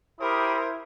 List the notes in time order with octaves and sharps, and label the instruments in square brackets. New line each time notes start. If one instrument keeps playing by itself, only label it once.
[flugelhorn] E4 [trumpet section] G4 B5 D#6 [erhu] A#4 [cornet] C5